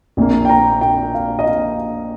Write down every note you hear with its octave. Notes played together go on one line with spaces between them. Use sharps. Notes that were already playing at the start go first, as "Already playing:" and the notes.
A#1 A#2 A#3
G5
A#5
G5
F5
D#5
F5